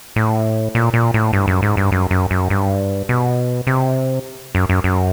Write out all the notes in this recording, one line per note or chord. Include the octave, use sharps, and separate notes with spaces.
A2
A#2
A#2
A2
G2
F#2
G#2
G2
F#2
F#2
F#2
G2
B2
C3
F#2
F#2
F#2